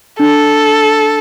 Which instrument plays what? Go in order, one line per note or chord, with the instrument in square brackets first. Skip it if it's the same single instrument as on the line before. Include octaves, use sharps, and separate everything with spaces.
[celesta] D4 [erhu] A4